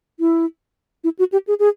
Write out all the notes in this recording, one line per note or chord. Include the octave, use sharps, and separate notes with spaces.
E4
E4
F#4
G4
G#4
G#4